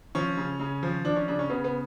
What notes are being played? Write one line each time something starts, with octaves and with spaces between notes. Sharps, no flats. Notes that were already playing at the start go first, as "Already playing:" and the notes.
F3 C#4
C#3
C#3
F3
F3 D4
C#4
C#3 D4
C#4
C#3 B3
B3